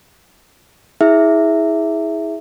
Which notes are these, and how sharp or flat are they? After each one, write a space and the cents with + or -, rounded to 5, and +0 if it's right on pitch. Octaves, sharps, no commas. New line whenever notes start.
E4 -30 G#4 +0 E5 +0